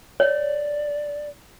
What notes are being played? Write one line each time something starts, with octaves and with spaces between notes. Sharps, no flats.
C#5 D5